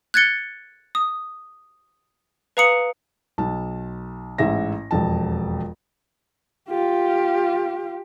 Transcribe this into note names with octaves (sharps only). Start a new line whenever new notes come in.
F#6 G#6 A6 C#7 G7
D#6
B4 F5 A#5 D#6 C#7 F#7
B1 A5
A1 G#2 E5 A#6
E1 F2 A5
F4 G4